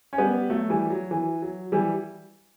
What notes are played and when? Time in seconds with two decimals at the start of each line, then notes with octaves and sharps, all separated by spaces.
0.13 C#4
0.18 G3 B3
0.50 F#3 A3
0.70 E3 G3
0.90 F#3
1.11 E3
1.42 F#3
1.72 E3 G3